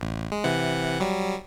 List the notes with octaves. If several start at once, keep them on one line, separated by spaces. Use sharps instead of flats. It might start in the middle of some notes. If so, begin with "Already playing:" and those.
A1
G#3
C3 E3 F#5
F#3 G3